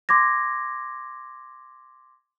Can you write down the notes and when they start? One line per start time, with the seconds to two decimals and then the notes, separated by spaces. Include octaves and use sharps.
0.09 C6 D6 G#6 A#6